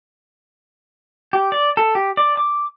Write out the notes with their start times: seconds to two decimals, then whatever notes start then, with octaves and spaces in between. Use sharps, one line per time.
1.33 G4
1.52 D5
1.77 A4
1.95 G4
2.17 D5
2.37 D6